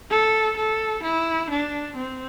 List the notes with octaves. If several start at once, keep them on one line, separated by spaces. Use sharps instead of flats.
A4
A4
E4
D4
C4